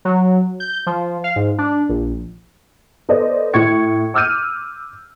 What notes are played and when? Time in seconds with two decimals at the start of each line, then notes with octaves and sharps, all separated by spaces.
0.05 F#3
0.60 G6
0.86 F3
1.24 F5
1.36 G#2
1.58 D4
1.89 A#1
3.09 B3 A4 C5 D5 D#5
3.54 A2 C#6 G#6 C#7
4.14 D6 E6 F6 G6 D#7